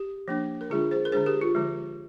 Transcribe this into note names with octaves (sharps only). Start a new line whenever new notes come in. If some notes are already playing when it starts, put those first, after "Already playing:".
Already playing: G4
F3 A#3 D4
A#4
D3 G#3 D4 F4 G#4
G#4 C5
A#4
D3 G#3 D4 G#4 C5
G4 A#4
F4
D3 F3 G#3